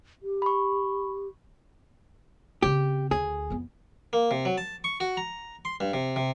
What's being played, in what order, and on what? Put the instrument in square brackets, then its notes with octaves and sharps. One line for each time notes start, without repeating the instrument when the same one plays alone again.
[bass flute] G4
[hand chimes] B5 C#6
[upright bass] C#3 C4 [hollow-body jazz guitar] G4
[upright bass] D2 [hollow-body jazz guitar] G#4
[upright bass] F2 B3
[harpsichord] A#3
C3
F#3
A5
C#6
F#4
A#5
C6
G2
C3
C3